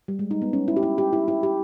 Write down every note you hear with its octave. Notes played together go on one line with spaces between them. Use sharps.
G3
G#3
D#4
B3
C#4
E4
G4
E4
G4
E4
E4
G4